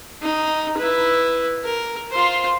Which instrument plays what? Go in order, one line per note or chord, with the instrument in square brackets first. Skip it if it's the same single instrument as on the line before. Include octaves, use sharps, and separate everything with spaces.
[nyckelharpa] D#4
E4 B4
A#4
F4 C5